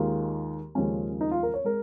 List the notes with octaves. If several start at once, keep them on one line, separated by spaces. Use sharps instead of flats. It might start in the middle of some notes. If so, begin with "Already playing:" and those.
Already playing: D#2 D#3 G#3 F4
D#2 C#3 F3 G#3 C#4
D#4
F4
A#4
C#5
G#3 A#4